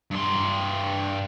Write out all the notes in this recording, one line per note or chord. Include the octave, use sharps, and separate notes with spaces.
G2 C6